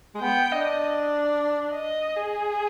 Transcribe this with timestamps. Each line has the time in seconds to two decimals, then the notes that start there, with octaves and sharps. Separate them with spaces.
0.14 G#3
0.21 B3 G5
0.52 D4 D#5
1.72 D#5
2.17 G#4